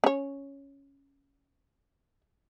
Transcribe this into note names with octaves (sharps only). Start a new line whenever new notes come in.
C#4 C#5